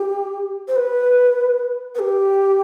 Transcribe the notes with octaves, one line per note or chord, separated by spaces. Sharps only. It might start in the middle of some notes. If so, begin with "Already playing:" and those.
Already playing: G4
C5
B4
B4
G4